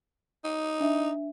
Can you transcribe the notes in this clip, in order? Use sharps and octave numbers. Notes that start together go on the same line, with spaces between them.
D#4
D4 E5